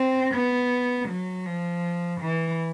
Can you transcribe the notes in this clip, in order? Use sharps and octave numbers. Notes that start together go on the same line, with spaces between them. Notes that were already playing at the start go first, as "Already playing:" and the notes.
Already playing: C4
B3
F#3
F3
E3